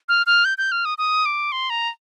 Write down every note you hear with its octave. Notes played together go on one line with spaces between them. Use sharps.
F6
F6
G6
G6
F6
D#6
D#6
D6
C6
A#5